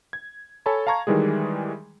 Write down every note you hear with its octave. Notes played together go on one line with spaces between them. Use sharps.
G#6
A4 C#5 G#5 A5 B5
F5 A5 A#5 C#6 G#6
D#3 E3 G3 G#3 G#4